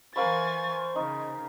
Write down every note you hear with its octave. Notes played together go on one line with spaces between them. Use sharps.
E3 A#4 C5 F5 G#5 B5 C#6 A6
C#3 D#4